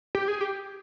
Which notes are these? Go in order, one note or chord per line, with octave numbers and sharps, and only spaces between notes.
G4
G#4
G4